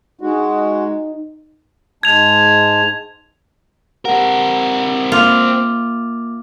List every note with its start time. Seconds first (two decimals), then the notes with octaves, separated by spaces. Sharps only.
0.21 G#3 D#4 F#4
2.03 G#2 G#3 A5 G#6 F7
4.05 C4 G4 A#4 F#5
5.12 A#3 F4 D6